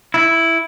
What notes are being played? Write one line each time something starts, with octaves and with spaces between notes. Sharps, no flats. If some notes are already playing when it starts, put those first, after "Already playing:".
E4